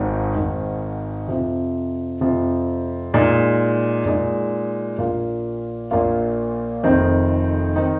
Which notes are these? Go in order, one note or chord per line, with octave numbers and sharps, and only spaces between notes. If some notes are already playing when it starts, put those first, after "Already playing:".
Already playing: G#1 G#2 D#3
G#1 G#2 D#3
F2 C3 F3
F2 C3 F3
A#2 G#3 D#4
A#2 G#3 D#4
A#1 A#2 A#3 F4
A#1 A#2 A#3 F4
F1 F2 D#3 C4 D#4
D#3 C4 D#4